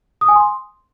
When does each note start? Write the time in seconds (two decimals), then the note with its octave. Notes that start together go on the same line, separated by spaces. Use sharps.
0.21 D#6
0.28 G#5
0.36 C6